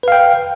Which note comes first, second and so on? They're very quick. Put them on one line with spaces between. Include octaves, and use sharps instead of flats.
B4 F5 G5